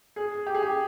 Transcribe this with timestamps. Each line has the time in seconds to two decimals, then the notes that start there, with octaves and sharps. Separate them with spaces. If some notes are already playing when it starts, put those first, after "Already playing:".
0.16 G#4
0.46 G4
0.55 G#4
0.62 G4